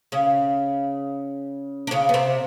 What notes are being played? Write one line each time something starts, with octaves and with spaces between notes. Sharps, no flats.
C#3 C#4
D4
C#3 C#4
B3
C3 C4